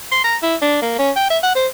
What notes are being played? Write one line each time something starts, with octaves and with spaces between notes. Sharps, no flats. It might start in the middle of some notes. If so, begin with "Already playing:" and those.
C6
A#5
E4
D4
A#3
C#4
G5
E5
F#5
C5